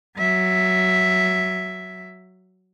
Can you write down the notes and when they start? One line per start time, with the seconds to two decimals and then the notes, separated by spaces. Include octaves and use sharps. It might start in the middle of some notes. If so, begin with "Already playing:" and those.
0.17 F#3 E5